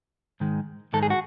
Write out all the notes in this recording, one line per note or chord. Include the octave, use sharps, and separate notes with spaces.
G#2 D#3 G#3
G#2 D#3 G#3 A4
G#4
F#4